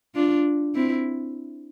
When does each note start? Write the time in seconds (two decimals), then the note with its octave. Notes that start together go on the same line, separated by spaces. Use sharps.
0.15 D4 F4
0.75 C4 E4